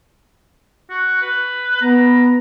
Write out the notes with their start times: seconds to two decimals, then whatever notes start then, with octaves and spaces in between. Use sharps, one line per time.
0.90 F#4
1.22 B4
1.81 B3 A#5